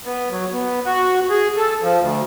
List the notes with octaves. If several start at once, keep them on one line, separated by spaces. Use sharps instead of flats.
B3
F#3
B3
F#4
G#4
A4
F3
D2